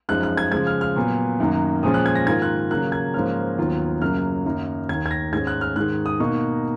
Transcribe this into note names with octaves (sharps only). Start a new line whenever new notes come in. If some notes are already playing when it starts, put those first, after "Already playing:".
F#2 F3 G#3 D#4 F#6
F#6
G#6
C#3 F3 G#3 G#6
F6
F6
A#2 F#3 B3
F#2 D#3 F#3 A#3
A#2 F3 G#3 C#4 D#6
F#6
G#6
A#6
G#2 D#3 A#3 F4 G#6
F#6
C#3 F#3 A#3 F#6
G#6
G#2 F3 A#3 C#4 F6
D#2 D#3 F#3 B3 F4
F#2 C#3 F#3 A#3 F6
F#2 D#3 A#3 D#4
D#2 D#3 A#3 G#6
G#6
A#6
G#2 D#3 G#3 C#4 G#6
F#6
F6
G#2 D#3 G#3 F#6
D#6
B2 A#3 D#4 C#6